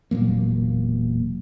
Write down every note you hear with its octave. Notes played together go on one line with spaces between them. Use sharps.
E1 A#2 F#3 A#3